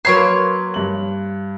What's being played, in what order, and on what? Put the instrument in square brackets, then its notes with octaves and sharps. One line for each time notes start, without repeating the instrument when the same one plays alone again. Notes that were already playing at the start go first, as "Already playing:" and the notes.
[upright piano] F#3 B4 G#6 [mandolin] A#3 C#5 C6
[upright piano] G2 F#7